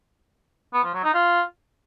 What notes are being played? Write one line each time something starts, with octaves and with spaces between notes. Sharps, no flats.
B3
F3
F#3
D#4
F4